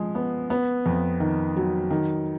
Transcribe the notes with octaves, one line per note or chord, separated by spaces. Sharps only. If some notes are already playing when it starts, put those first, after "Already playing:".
Already playing: F3 G#3
B3
B3
F2
D#3
F#3
D#3